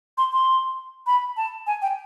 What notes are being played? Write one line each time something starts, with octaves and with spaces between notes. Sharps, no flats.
C6
C6
B5
A5
G#5
G5